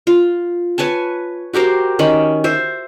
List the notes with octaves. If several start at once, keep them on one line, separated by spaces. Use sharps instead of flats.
F4
B4 C#5 G#5 A5
F#4 G4 A#4 C5
D#3 C#4 B5
C5 E5